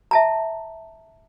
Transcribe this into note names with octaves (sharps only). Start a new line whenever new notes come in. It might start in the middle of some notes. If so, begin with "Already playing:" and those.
E5 A5 A#5